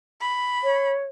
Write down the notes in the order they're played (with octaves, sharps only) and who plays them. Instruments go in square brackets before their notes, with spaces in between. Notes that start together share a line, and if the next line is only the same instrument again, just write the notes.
[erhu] B5
[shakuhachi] C#5